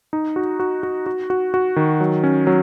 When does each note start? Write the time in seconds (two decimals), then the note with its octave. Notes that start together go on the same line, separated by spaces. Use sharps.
0.13 D#4
0.36 F#4
0.60 F#4
0.83 F#4
1.06 F#4
1.30 F#4
1.54 F#4
1.76 D#3
2.00 F#3
2.24 C#4
2.47 F#3